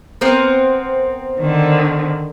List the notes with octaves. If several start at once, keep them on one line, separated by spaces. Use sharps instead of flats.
B3 C4 A#4
D3 D#3